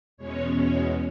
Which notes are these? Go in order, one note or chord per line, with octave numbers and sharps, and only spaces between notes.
E2 B2 G#3 C#4 C#5
C#5